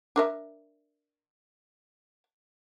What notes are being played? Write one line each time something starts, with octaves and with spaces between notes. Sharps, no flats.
D4 A#4 E5